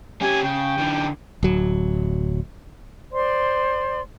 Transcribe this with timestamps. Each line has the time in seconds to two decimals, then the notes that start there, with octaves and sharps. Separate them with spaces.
0.21 C#4 G4 G#5
0.43 C#3 G5
0.78 D3 E3
1.43 D1 F#3
3.12 C5 D5 C6